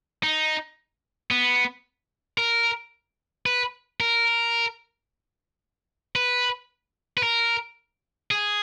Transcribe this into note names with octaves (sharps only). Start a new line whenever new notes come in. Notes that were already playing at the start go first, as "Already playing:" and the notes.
D#4
B3
A#4
B4
A#4
B4
B4
A#4
G#4